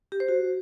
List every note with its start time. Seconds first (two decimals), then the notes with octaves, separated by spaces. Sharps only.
0.12 G4
0.20 C5
0.29 F#4